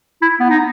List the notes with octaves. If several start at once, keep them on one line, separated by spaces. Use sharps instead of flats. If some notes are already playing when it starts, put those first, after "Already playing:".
E4
B3
D#4